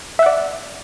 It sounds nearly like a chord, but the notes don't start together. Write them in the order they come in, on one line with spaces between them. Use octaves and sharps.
E5 F#5 D5